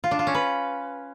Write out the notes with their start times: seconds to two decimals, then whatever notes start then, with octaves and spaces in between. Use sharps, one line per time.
0.04 F4
0.11 D4
0.19 F4
0.27 C#4
0.34 B4